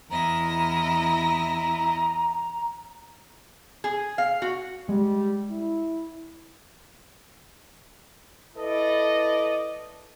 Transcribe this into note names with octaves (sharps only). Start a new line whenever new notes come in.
E2 E4 D#5 A#5
G#4
F5
F#4
G3 G#3
E4
E4 A4 B4 D5 D#5